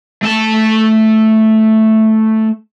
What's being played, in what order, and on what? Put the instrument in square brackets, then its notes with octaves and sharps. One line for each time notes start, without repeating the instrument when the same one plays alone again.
[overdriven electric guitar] A3 A5